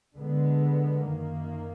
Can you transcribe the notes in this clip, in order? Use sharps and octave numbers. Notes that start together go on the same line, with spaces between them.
D3 G#3 B3
F#2 D#3 A#3